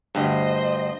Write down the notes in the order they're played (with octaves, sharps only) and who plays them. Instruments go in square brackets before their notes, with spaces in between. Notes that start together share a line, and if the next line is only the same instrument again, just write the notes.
[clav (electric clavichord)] D2 G2 [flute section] C5 [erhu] D#5